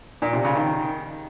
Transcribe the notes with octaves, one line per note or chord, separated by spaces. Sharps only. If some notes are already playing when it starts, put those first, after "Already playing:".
A#2
C3
C#3
D#3